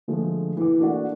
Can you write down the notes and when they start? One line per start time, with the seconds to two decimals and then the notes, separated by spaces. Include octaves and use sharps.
0.08 D3 F3 G#3 A3
0.57 E3 D6
0.79 A3 A#3 D4 F#4 D5 F#5